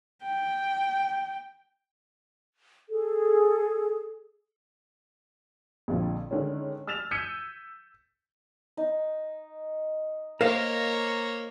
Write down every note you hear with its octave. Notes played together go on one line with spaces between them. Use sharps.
G5
G#4 A4
A#1 F2 D3 F3
D3 D#3 G#3 C#4
E6 F6 A6 E7 F7
E6 G6 G#6 B6 C#7 D#7
D#4
A#3 A#4 C5 C#5 F5 A#5